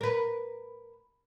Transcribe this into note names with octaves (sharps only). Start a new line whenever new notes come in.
A#4 B4